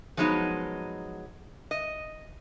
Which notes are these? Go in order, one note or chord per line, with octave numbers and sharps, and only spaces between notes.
F3 F#3 G#3 B3 D#4
D#5